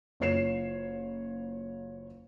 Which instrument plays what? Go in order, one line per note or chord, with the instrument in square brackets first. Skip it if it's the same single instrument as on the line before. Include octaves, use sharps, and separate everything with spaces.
[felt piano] F#1 F4 C#5 C7 E7